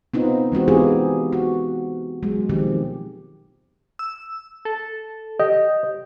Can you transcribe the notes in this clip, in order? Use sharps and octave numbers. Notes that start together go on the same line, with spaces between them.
B3 C4 D#4 F4
E3 G#3 C4 F#4
B3 D#4 F4 G4 G#4
F#4
F#3 G#3
B2 D#3 F3 C4 G4
E6
A4
G4 D#5